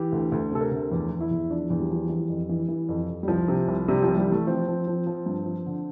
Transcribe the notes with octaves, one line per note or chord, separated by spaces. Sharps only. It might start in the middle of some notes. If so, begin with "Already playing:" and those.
Already playing: E3 G4
D2
D2
C3 A4
A#4
D2
E2
E2
E4
E2
F3 D4
E2
G3
F3
E3
F2
E3
E3
F2
F2
G3
C2 F3
C3
C2
C3 G3
C2 F3
G3
E3 A3
F3 C4
F3
F3
F3
G2
F3
D3